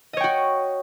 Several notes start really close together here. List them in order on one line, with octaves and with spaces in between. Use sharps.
D#5 C#5 G5 F#4